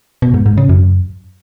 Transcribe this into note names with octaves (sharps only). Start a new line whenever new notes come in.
B2
G#2
G#2
C#3
F#2